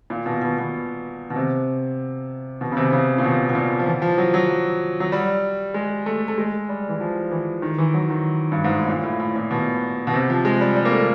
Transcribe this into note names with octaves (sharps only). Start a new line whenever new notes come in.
A#2
B2
B2
B2
B2
C3
B2
C#3
C3
C#3
A#2
B2
B2
A#2
F3
E3
F3
F#3
F#3
F#3
G3
G#3
A3
A3
G#3
G3
E3
F3
E3
D#3
E3
F#3
D#3
G2
G#2
A2
A#2
A2
A2
A#2
B2
B2
C3
F3
G#3
G3
G3
A#3
A3